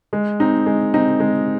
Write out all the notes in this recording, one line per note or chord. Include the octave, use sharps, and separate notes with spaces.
G#3
C4 D#4
G#3
C4 D#4
G#3